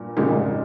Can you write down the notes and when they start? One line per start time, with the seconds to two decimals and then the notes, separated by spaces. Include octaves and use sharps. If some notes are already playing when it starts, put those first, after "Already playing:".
Already playing: G2 A#2
0.17 F2 A#2 C#3 G#3 D#4 G4
0.31 G#2